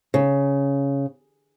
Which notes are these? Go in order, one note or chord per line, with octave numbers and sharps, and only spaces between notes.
C#3